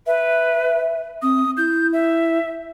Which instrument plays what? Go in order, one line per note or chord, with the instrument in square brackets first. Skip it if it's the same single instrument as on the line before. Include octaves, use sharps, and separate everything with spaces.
[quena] B4 [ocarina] E5
[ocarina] C4 [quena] D#6
[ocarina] E4 [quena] G6
[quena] E5